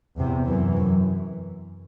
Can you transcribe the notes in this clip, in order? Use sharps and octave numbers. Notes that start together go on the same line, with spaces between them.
E2 C3
F#2 E3
F#2